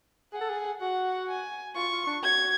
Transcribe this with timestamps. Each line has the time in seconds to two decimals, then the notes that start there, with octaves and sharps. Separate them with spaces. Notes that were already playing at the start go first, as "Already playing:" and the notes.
0.33 G#4 F#5
0.41 A4
0.49 G#4
0.81 F#4 F#5
1.28 G#5
1.76 F4 C#6
1.92 F4
2.07 D4
2.23 F#4 G#6